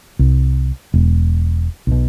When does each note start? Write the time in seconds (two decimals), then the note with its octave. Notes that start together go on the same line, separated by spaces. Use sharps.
0.19 C2
0.94 E1
1.87 B1 B2